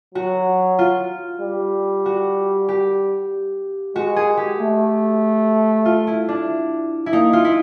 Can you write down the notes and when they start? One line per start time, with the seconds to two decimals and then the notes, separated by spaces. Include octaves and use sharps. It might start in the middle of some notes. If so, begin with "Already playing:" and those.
0.15 F#3 F#4
0.79 F4
1.41 G3
2.06 F#4
2.68 G4
3.96 G#3 F#4
4.16 G#4
4.37 G4
4.59 A3
5.85 F4
6.07 E4
6.28 D4
7.06 E4
7.12 A#3 D#4
7.33 F4
7.45 E4